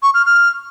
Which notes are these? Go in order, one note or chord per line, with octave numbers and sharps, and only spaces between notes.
C#6
F6
F6